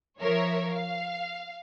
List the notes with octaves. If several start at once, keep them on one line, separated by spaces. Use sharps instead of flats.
F3 A#4 C#5 E5
F5